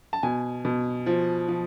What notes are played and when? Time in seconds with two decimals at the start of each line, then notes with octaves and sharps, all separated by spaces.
0.13 A5
0.23 B2 G#5
0.65 B2
1.06 F3
1.48 F3